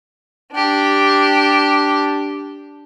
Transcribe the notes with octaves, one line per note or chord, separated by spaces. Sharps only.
D4 G4